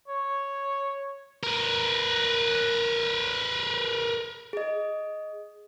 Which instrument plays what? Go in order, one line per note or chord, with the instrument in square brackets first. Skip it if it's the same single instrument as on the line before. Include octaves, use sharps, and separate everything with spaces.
[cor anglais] C#5
[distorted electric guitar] A#4 B4
[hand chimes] G#4 D#5